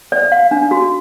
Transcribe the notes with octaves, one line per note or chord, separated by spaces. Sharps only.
D5
F5
D4
F#4